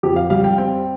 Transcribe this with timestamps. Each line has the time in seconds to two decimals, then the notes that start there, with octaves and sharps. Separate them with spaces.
0.03 F2 G4
0.16 F5
0.30 G3 F5
0.44 G5
0.58 C4 G5